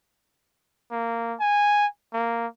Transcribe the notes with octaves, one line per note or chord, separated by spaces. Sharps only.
A#3
G#5
A#3